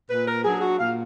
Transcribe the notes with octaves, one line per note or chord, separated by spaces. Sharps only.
A#2 B4
A#4
F#3 D4 G#4
F#4
A#2 F5